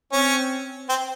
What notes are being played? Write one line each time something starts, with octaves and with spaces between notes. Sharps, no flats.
C4 C#4
C4